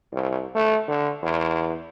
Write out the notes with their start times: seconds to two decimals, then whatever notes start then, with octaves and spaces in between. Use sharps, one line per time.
0.12 C2
0.55 A3
0.88 D3
1.23 E2